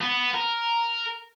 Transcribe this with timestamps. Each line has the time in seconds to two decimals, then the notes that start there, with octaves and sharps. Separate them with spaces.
0.01 B3
0.34 A#4